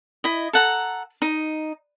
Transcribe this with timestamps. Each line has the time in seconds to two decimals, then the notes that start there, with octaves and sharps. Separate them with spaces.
0.24 E4 D#5
0.53 A4 F#5 A#5
1.22 D#4